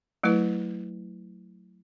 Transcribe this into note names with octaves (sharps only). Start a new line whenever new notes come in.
F#3 A3 E4 B4